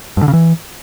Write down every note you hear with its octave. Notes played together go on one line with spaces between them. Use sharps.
G2
D3
C#3
E3